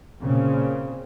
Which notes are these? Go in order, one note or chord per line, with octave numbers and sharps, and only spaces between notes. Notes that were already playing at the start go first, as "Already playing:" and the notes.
A#2 C#3 C4